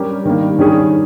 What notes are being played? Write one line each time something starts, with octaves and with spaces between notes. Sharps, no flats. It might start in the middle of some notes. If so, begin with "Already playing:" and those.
Already playing: G3 C#4 G4 A#4
D#3 G3 A#3
D#3 G3 C#4 G#4